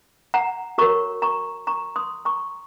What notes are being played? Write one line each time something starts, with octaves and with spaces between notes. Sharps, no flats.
F#5 A#5
F#4 A#4 C#5 A#5 C#6
A#5 C#6
A#5 C#6
C6 D#6
A#5 C#6